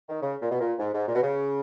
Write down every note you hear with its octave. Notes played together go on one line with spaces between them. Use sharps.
D#3
C#3
A#2
B2
A#2
G#2
G#2
A#2
B2
C#3